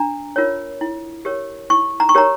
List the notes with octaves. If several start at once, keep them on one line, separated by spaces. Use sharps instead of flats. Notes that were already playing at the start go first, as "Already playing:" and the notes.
Already playing: D4 A#5
F4 A#4 C#5
E4
G4 A#4 C#5
E4 C#6
A#5
C#6
G4 A#4 C#5 A#5